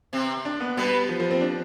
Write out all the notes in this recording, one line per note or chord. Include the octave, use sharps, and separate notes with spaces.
C3 C4
D4
B3
B2 G3 B3
F3
F3
C4
D4